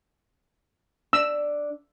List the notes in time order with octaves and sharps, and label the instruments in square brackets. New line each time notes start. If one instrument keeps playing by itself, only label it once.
[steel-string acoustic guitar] D4 D5 [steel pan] E6